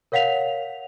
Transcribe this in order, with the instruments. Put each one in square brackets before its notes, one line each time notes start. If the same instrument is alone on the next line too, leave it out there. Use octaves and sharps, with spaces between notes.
[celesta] A#4 C#5 F5 F#5 B6 F7